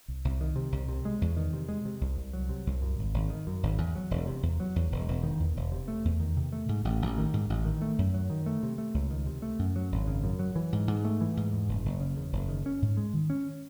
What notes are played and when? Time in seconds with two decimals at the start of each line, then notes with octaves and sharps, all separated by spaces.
0.08 C2
0.25 C2
0.41 D#3
0.56 C3
0.72 C2
0.89 C3
1.05 G#3
1.21 E2
1.37 D#3
1.53 C3
1.69 G#3
1.85 C3
2.01 C2
2.17 C2
2.33 F#3
2.49 C3
2.66 C2
2.82 F#2
2.98 G#1
3.14 G#1
3.30 D#3
3.47 F#2
3.63 G#1
3.78 E2
3.95 F#3
4.11 E1
4.27 C3
4.43 E2
4.60 F#3
4.76 E2
4.92 E1
5.08 E1
5.23 D#3
5.40 E2
5.56 E1
5.72 C3
5.88 A3
6.05 E2
6.20 D#3
6.36 C3
6.52 A3
6.69 G#2
6.85 A1
7.02 A1
7.18 D#3
7.33 G#2
7.50 A1
7.65 D#3
7.82 A3
7.98 F#2
8.14 F#3
8.30 D#3
8.46 A3
8.63 C3
8.78 A3
8.94 C#2
9.11 D#3
9.26 C3
9.42 A3
9.59 F#2
9.76 F#3
9.92 G#1
10.07 C#3
10.24 F#2
10.39 F#3
10.56 E3
10.72 G#2
10.88 G#2
11.05 A3
11.21 E3
11.37 G#2
11.53 E2
11.68 F#1
11.85 F#1
12.00 C#3
12.17 E2
12.32 F#1
12.49 D#3
12.66 C#4
12.82 G#2
12.97 G#3
13.13 D#3
13.30 C#4